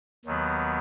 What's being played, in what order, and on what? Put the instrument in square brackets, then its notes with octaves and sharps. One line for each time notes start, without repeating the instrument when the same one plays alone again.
[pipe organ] D#2 D#3 F#3 B3